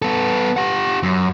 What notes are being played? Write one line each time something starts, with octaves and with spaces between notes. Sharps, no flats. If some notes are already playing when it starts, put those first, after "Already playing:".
B3 A4
G4 F#5
F#2